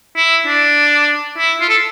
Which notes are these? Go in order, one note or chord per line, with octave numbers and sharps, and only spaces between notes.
E4
D4
E4
F4
A4